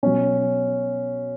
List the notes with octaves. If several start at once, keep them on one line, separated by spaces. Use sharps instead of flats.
B2 F#3 C#4